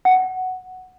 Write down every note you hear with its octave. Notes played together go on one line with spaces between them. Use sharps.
F#5